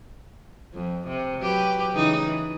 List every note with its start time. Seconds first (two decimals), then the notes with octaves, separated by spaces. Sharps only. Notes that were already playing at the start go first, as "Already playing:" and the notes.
0.74 F2
1.08 C3
1.41 F#3 G4 B4
1.94 C#3 E3 D#4
2.24 E3